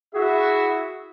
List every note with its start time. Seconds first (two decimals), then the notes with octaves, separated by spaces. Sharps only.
0.14 E4 F#4 G#4 E5